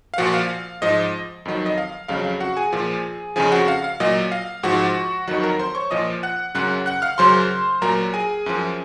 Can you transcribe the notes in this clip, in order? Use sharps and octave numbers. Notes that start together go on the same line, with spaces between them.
F5
A#2 F3 F#4 F#5
F5
G#2 F3 D#5
F2 D#3 F#3
D#5
F5
F2 C#3 F#3 F5
F5
F#4 F#5
G#4 G#5
A#2 F3
F2 C#3 F3 G#4 G#5
F#4 F#5
F5
F5
A#2 F#3 D#5
F5
G#2 F3 F#4 F#5
F2 D#3 F#3 F#4 F#5
A#4 A#5
C5 C6
C#5 C#6
A#2 F3 D#5 D#6
F#5 F#6
F#2 C#3 F#3 F#5 F#6
F#5 F#6
F5 F6
F#2 C#3 F#3 C5 C6
A#2 F#3 A#4 A#5
G#4 G#5
F#2 F3